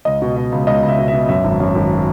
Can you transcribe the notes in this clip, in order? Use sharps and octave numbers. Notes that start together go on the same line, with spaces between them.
C#2 D#5
B2
B2
C#2
C#2 D#5
C#2
E5
B2
E5
B2
F#2 E5
G#1
F#2
G#1